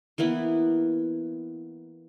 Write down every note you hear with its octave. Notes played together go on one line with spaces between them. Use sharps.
E3 A#3 B3 E4